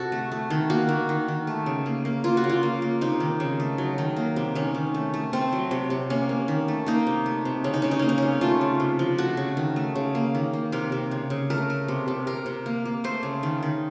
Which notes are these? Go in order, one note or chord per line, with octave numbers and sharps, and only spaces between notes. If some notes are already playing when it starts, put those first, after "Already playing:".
Already playing: C3 F#4 A4
A3
A3
D#3
A#3 F#4
D#3
D#3
D#3
A3
C#3
A#3
A#3
A#3 F4
F#4
C#3
F4
A#3
A#3
C3 D#4
D#3
C#3
A3
F#3
D#3
A#3
C3
D#3 C#4
D#3
A3
A3
A3 C4
F#3
C3
C3
A#3 C#4
A#3
D#3
A3
A#3 D#4
C3
A3
C3
C#3 C#4
D#4
C#3 C#4
D#4
A#3 C#4
D#4
C3 C#4
A3 F4
C#3
C3
F3
A3 F#4
C#3
D#3
A3
C#3
A#3
D#3
A#3
C3 A#4
C3
C#3
C#3
A3 A#4
A3
C3
C3
C3 A#4
C3
A#3
A#3
A3 C5
C#3
D#3
D#3